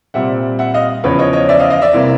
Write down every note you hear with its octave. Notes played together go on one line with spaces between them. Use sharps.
A#2 G3 C4 E5 F#5
E5 F#5
D#5 F5
E2 C#3 F3 B4 C#5
C#5 D#5
C#5 D#5
D5 E5
D#5 F5
D#5 F5
D5 E5
C3 E3 G3 A#3